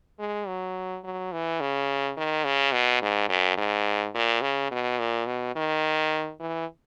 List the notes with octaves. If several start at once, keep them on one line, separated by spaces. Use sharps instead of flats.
G#3
F#3
F#3
E3
C#3
D#3
C#3
B2
G#2
F#2
G#2
A#2
C#3
B2
A#2
B2
D#3
E3